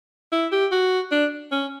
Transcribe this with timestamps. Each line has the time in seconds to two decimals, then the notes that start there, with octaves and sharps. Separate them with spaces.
0.32 E4
0.52 G4
0.72 F#4
1.11 D4
1.52 C#4